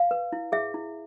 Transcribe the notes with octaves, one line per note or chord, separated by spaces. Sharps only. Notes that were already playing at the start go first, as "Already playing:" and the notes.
Already playing: F5
B4
E4
G#4 E5
E4